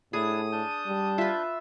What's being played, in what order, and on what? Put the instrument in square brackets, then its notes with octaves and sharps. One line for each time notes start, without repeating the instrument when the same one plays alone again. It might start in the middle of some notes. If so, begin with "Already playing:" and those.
[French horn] A2 [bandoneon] D4 E4 A5 [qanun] G#4 [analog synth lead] D#6
[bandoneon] D4 A5 G6
[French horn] G3
[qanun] F4 B4 [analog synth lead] E5